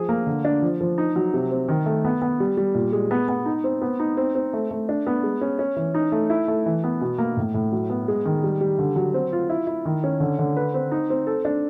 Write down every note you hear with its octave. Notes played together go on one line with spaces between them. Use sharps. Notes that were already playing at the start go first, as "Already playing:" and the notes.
Already playing: F3 G#4
A#3
D3
D4
F3
F3
D#4
F#3
C3
C4
D#3
A3
B3
B3
G3
G3
A#2
G#3
B3
B3
D#4
C4
B3
D#4
C4
C4
A3
A3
D4
B3
G#3
C#4
C#4
E3
D#4
A3
E4
A3
E3
B3
B2
A#3
A2
A2
F#3
B3
G#3
D#3
G3
G3
D3
F#3
C4
F4
E4
E4
D#3
C#4
D3
D3
B4
C4
D#4
C4
A4
D4